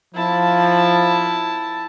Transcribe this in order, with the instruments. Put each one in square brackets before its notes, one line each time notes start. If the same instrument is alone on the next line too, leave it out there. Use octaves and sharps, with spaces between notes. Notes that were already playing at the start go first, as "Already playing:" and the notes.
[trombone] F3 [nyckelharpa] E4 A5